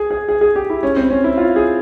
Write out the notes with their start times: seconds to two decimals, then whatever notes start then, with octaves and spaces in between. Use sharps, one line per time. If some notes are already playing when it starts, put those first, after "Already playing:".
Already playing: G#4
0.11 G#4
0.29 G#4
0.41 G#4
0.56 G4
0.70 E4
0.83 C#4
0.96 C4
1.10 C#4
1.24 E4
1.37 F4
1.56 G#4